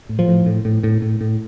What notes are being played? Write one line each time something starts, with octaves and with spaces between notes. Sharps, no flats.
A2
F3
A2
A2
A2
A2
A2
A2